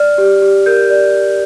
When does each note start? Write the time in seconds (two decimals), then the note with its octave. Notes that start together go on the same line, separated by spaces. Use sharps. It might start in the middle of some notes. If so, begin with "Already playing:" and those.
Already playing: D5 F6
0.18 G4
0.42 G4
0.66 A#4 G6
0.90 D5